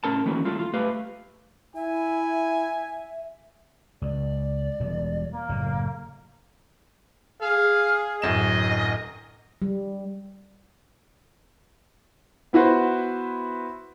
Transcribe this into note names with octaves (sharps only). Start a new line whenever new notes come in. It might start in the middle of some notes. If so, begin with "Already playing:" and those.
A2 C#4 A#4 A5
D#3 E3 A3 A#3 C#4 F#4
G3 A3 F4 A4
F4
A3 G4 B4 F5
E4 E5 G#5
C#2 D5
E1 B2 G3
A#3
F#1 A2
G#4 F5
D1 F#2 D#5 E7
G3
B3 E4 F#4 B4 C5